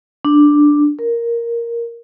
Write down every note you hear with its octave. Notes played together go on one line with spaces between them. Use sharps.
D4
A#4